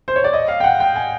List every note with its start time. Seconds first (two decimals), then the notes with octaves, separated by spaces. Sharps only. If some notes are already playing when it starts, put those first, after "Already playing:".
0.08 C5
0.16 C#5
0.24 D5
0.33 D#5
0.48 F5
0.60 G5
0.64 F#5
0.80 G5
0.96 G#5